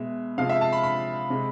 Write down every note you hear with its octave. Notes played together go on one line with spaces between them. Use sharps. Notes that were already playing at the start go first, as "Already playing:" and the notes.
Already playing: B2 G#3 E5
C3 F3 G#3 F5
E5
A5
B5
B5
C3 G#3